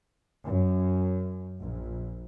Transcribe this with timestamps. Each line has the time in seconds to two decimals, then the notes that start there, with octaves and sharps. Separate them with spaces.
0.46 F#2
1.60 A#1